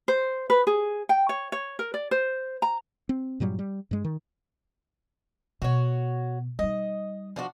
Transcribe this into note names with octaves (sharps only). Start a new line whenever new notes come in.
C5
B4
G#4
G5
C#5
C#5
A#4
D5
C5
A#5
C4
G2 A#2 F#3 G3
G3
G2 G#3
D#3
B2 F#4 C#5
G3 D#4 D#5
F3 D4 F#4